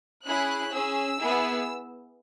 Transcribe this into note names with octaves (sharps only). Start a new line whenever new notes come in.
C#4 E4 G#4 F#6
C#4 G#4 E6
B3 E4 G#4